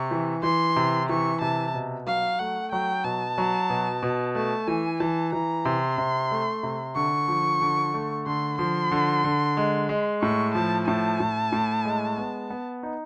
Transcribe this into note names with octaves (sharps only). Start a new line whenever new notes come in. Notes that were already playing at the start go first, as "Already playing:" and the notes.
Already playing: C3 C#6
E3
E3 C6
C3
E3 C#6
C3 A5
B2
F#3 F5
A3 F#5
F#3 G5
B2 A5
F#3
B2
B2
A3 A5
E3 G#5
E3 A5
E3 A#5
C3 C6
C3
A3
C3
D3 C#6
F3
D3
A3
D3 C6
F3 C6
D3
D3
G#3
G#3
A2 C#6
F3 A5
A2 A5
A2
A2
G#3
B3
B3
D#4